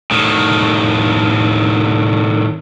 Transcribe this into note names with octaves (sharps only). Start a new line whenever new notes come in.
A2 D#3